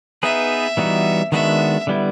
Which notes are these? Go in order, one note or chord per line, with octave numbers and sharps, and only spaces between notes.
B3 D#4 G#4 B4 E5
E3 G3 B3 D#4 F#4
D#3 G#3 B3 D4 F#4 E5
D3 G3 B3 E4